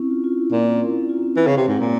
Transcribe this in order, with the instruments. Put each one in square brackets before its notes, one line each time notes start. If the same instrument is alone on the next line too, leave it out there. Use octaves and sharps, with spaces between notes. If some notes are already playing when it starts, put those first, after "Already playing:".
Already playing: [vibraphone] C4 C#4 E4
F4
F4
E4
[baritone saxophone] A#2 [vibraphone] F4
[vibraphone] C4
C#4
E4
F4
C4
[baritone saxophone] E3 [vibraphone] C4
[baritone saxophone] C#3
[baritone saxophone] C3 [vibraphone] C4
[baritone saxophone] G#2
[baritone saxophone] A#2 [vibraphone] A#4